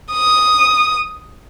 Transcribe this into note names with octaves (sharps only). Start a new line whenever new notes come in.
D#6